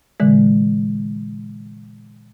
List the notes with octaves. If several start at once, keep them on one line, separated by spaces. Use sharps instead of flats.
A#2 D3 E3 G#3